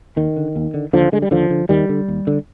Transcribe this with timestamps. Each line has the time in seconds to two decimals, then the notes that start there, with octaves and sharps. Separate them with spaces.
0.16 D#2 D#3
0.37 D3
0.56 D#2
0.74 D3
0.93 D#2 D3 F3
1.12 D3 G#3
1.22 G3
1.31 D#2 D3 F3
1.50 D3
1.69 D#2 D#3 G3
1.89 D3
2.08 D#2
2.27 D3